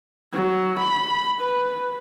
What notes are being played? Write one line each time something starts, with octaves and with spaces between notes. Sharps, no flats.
F#3
B5
B4